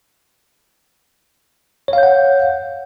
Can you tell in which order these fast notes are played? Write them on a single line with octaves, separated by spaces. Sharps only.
C#5 F5 G6 F#5